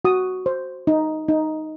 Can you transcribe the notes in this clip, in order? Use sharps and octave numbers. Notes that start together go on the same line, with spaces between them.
F#4 D#6
C5
D#4
D#4